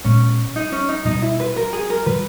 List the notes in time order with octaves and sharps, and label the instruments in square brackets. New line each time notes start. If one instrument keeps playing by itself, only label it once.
[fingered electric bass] A#2 G#3 B3 [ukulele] C#4
[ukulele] D#4
C#4
D#4
[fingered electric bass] B2 G3 B3 [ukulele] D#4
[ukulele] E4
B4
A#4
G#4
A#4
[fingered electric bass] D#3 G3 [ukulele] B4